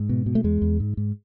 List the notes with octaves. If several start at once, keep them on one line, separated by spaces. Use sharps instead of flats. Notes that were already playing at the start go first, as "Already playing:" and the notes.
Already playing: G#2
B2
B2
A3
E2 G#3
E2
G#2
G#2